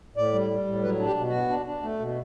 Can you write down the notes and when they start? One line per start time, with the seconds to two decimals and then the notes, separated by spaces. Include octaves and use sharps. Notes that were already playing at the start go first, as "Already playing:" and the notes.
0.16 A2 D5
0.33 G3
0.51 G3
0.67 A2
0.83 F#3 B4
0.99 D4
1.05 G4
1.17 B2
1.28 B3 F#4
1.49 D4
1.66 D4
1.83 A3
1.99 B2